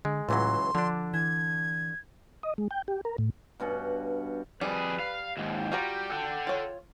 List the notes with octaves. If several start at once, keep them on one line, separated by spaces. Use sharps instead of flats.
D3 G#3
C#2 A2 E3 F#3 C6
D3 F3 D4
E3 G#6
D#5
G#3
G5
G4
A#4
A2
G2 B2 C#4 F#5
F2 G3 G#4 B4
F5
D#2 G#2 G5
G3 F4 F#4 A#5
A4 F#5
F4 C#5